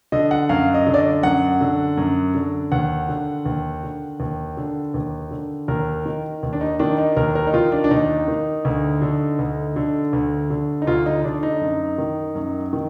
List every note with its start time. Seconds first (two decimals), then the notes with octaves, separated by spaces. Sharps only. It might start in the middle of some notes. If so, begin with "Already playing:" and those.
0.12 D3 D#5
0.31 F#5
0.49 F#2 F5
0.74 D#5
0.87 D3
0.94 D5
0.98 D#5
1.23 F#2 F#5
1.61 D3
1.97 F#2
2.35 D3
2.72 D#2 F#5
3.09 D3
3.46 D#2
3.83 D3
4.20 D#2
4.57 D3
4.94 D#2
5.31 D3
5.68 D#2 A#4
6.06 D#3
6.43 D#2
6.53 D4
6.61 D#4
6.80 D#3 D4
6.98 D#4
7.17 D#2 A#4
7.35 A#4
7.47 D#4
7.54 D#3 F4
7.72 D4
7.84 D4
7.91 D#2 D#4
8.28 D#3
8.65 D2
9.02 D3
9.39 D2
9.76 D3
10.13 D2
10.50 D3
10.82 D#4
10.87 D2 F4
11.06 D#4
11.24 D3 D4
11.43 D#4
11.61 F#2
11.98 D#3
12.35 F#2
12.73 D#3